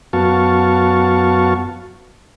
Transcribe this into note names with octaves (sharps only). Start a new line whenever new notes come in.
F#2 B3 F#4 F5 A5 C#6